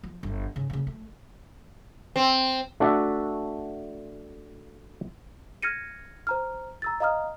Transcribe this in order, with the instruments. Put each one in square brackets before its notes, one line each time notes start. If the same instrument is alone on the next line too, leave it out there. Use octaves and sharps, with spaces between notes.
[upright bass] F3
G1
G#2 C#3
C#3 A#3
A3
[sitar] C4
[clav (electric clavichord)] A3 D4 F#4 D5 E5
[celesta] F6 G#6 A#6 C#7 D#7
C5 A#5 F6
A#5 E6 A6
D#5 F5 A#5 D#6 F6